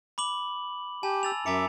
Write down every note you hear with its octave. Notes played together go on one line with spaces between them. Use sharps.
B5 D6 F#7
G4 G#5 A5
E6 A6 F7
F#2 E5 G#5 A#5 D6 C#7